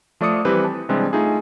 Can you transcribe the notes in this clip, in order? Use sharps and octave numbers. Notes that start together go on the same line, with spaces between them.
F3 A3 D5 D6 D#6 C#7
E3 G3 C4 G4 B4
A5
C3 E3 G3 G#3 C4 D4
A3 D#4 F4 G#4